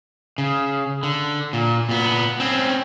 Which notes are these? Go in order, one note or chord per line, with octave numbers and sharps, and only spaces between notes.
C#3
D3
A#2
A#2 B3
C4 C#4